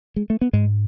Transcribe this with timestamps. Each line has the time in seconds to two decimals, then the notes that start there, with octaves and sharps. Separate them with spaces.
0.16 G#3
0.30 A3
0.41 B3
0.53 G#2 G#3